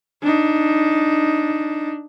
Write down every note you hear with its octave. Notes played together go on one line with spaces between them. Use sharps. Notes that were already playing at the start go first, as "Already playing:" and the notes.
D4 D#4